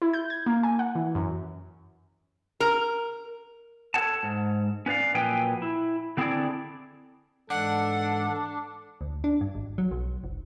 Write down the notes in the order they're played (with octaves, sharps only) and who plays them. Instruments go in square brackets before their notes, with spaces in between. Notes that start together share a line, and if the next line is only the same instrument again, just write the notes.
[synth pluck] E4
G6
G#6
A#3
G#5
F#5
E3
F#2
[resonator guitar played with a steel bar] A#4
[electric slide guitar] A4 A#4 C#5 F#5 A5
G#2
C#4 B4 D5 F5
A#2 F3 F#3 B4 G5 G#5
E4
D3 C4 E4 G#4 A4 D5
[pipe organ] G#2 E3 G#3 [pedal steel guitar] D4 [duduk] A4 [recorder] F#5
[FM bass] D2
D4
G2
G#1
F#3
B1
F1